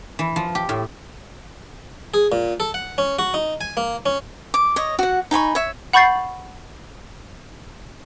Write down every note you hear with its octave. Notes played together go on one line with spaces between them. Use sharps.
E3
F3
G4
A2
G#4
A#2
A4
F#5
C#4
F#4
D#4
G#5
A#3
C#4
D6
C#5 D#5
F#4 F#5
D#4 G#5 B5 C#6
C#5 E5
F#5 B5 C#6 G6 A6 C7